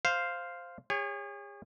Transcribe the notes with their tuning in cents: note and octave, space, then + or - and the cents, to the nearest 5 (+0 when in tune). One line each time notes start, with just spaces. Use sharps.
C5 +0 F5 +0
G#4 -40 C#5 +0